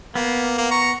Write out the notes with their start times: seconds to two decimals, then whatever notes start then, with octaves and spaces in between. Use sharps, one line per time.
0.16 A#3 B3
0.58 A#3
0.71 A#5 C#6